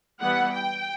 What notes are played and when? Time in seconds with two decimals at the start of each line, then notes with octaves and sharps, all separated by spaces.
0.21 E3 G3 B3 F#5
0.52 G5